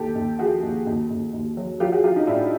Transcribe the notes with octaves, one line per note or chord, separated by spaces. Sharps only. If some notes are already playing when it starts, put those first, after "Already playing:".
Already playing: D#2 G4 A4
D#2
F3 F#4 G#4
D#2
D#2
D#2
D#2
F#3
F#3 F4 G4
F#4 G#4
F#3 F4 G4
D#4
A2 D4 E4